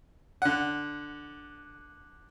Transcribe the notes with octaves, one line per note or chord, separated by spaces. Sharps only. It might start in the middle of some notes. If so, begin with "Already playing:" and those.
D3 F#5